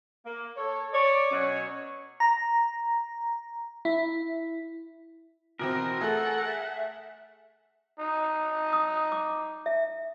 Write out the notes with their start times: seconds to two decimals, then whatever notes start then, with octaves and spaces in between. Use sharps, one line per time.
0.25 A#3
0.57 A4 C#5
0.93 C#5 D5
1.31 B2 F#3 C#4 C#5
2.20 A#5
3.85 E4
5.59 B2 E3 C4 A#4
6.01 A3 G#4 A4 F#5
6.45 E5
7.99 D#4
8.73 D#6
9.12 D6
9.66 E5